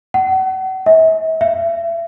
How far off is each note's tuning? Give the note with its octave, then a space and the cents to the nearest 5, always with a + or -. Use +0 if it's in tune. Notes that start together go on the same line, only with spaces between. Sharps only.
F#5 +35
E5 -40
E5 +30